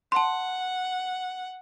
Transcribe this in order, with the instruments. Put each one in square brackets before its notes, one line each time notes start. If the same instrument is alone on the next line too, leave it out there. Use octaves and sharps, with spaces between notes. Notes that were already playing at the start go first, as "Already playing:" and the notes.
[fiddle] F#5 [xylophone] A5 C6